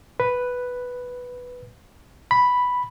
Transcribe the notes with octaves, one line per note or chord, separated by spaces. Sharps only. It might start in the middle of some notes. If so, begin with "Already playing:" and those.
B4
B5